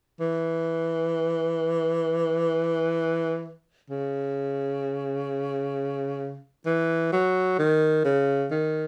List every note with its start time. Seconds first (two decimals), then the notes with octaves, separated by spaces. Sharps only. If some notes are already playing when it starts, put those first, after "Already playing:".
0.20 E3
3.90 C#3
6.66 E3
7.12 F#3
7.59 D#3
8.05 C#3
8.51 D#3